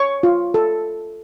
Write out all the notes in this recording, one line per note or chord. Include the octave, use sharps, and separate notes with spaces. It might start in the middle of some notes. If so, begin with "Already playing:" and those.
Already playing: C#5 C#6
F4
A4